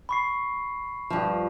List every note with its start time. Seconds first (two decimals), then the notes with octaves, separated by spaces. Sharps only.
0.09 B5 C#6 C7
1.10 G2 F3